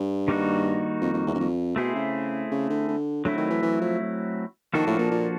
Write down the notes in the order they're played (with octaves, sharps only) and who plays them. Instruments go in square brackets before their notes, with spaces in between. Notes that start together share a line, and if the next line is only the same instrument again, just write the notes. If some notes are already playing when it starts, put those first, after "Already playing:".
Already playing: [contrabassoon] G2
[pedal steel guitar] D#3 G3 A#3 D#4 F#4
[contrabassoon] F2
F2
E2
F#2
F2
[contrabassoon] B2 [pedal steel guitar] A3 C4 E4 G#4 C5
[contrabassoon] C#3
C#3
D3
D3
[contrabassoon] D3 [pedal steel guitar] F#3 A3 C4 E4
[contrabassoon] D#3
E3
E3
F3
[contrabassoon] D#3 [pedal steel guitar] F3 A#3 D4 F#4 A4
[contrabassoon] A2
A#2
A#2